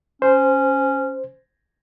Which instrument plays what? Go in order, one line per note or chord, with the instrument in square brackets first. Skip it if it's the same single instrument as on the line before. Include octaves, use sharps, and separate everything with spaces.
[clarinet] C#4 [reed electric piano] C5